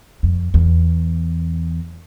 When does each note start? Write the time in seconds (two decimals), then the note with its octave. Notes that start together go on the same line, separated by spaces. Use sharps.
0.23 F2
0.54 E2